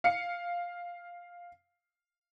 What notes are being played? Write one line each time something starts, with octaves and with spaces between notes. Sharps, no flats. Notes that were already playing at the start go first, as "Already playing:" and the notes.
F5 C#7